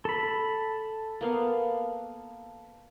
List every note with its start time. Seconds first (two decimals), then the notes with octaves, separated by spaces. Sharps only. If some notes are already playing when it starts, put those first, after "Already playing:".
0.05 A4 B5
1.21 A#3 B3 F5